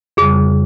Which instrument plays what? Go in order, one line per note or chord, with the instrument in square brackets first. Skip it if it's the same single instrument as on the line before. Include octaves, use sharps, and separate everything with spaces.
[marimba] F2 C#3 G3 [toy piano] G#4